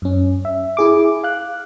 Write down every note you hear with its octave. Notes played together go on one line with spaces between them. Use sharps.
F#2 C#4
E5
E4 G#4 D6
F5 F#6